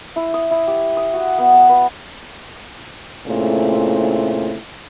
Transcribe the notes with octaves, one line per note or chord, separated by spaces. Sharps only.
E4
D#6
E4
G4
D#6
F#4
B3
A5
B4
A#2 C#3 A3 C4 E4